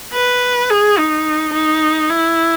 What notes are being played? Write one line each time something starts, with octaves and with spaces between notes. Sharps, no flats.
B4
G#4
D#4
D#4
E4